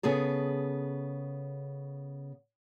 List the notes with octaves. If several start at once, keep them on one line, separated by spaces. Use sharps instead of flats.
C#3 B3 G#4 A4